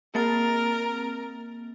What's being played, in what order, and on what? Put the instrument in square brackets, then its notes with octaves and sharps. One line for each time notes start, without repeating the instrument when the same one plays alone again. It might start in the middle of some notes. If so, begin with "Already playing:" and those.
[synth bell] A#3 C4 A6 [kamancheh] A#4